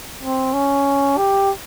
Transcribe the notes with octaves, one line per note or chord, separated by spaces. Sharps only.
C4
C#4
G4